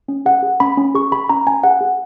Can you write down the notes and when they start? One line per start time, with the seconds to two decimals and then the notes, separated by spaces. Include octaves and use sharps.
0.08 C#4
0.25 G#4 F#5
0.43 G#4
0.60 C#4 B5
0.77 C#4
0.95 G#4 C#6
1.12 G#4 B5
1.29 C#4 A#5
1.46 C#4 G#5
1.64 G#4 F#5
1.81 G#4